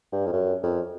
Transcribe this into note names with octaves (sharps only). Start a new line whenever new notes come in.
G2
F2
F#2
F2